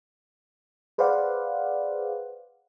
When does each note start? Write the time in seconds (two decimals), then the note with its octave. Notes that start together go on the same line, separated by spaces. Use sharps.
0.98 G#4 B4 C5 D5 F5 F#5